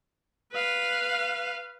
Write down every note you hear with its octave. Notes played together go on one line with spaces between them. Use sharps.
B4 F5